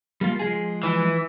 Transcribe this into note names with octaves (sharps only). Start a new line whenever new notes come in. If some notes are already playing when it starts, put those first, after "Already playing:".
G3 A#3 F4
F3 G#3 G#4
E3